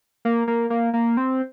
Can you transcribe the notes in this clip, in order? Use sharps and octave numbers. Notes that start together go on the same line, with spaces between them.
A#3
A#3
A#3
A#3
C4